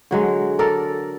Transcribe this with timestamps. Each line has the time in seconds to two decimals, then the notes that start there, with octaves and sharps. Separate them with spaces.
0.11 D3 F#3 G#3
0.59 A4 A#4 D5